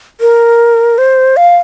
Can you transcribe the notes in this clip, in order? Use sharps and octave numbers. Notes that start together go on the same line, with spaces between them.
A#4
C5
F5